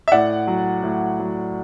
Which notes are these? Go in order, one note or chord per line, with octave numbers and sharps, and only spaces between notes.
E5
A2 D5 F#5
F#3
A2
F#3